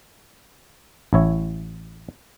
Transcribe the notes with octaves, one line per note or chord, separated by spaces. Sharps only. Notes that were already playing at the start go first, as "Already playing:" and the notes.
A1 E4 C#5